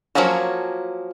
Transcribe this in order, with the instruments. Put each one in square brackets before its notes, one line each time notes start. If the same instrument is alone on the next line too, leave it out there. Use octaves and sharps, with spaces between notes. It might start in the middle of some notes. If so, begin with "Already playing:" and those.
[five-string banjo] F3 F#3 A#3 C#4 F#4